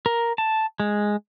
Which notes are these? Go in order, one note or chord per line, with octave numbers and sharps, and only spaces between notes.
A#4
A5
G#3